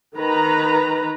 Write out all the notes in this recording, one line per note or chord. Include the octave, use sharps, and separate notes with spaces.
D#3 B4 A#5